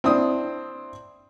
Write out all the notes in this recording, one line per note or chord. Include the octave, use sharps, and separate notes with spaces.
C4 D4 E4 D#6